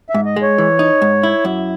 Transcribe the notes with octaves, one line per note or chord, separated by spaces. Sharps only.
G#2 E5
D#5
G#3
C#5
E3
D#4
G#2
E4
F#2